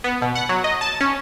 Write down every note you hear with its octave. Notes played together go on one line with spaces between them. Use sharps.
B3
B2
F#5
F#3
D#5
A5
C#4